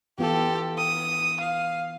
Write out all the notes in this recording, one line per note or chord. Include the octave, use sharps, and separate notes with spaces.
E3 B3 F4 G4 A4
D#6
F5